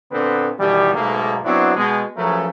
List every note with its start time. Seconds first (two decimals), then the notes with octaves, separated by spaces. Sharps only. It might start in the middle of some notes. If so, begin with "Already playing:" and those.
0.11 A#2 D3 B3 C4 B4
0.59 B2 D#3 E3 G3
0.94 B1 G#2 B2 A3 A#3
1.44 F#3 B3 C4 D4 E4 F#4
1.75 B2 G#3
2.16 C#3 F3 F#3 A3 A#4 B4